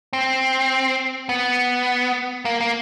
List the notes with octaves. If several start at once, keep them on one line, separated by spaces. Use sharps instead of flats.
C4
B3
A#3
A#3